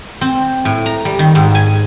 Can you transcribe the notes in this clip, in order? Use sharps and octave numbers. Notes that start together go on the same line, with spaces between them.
C4
A2
A#5
G3
D#3
G#2
G#5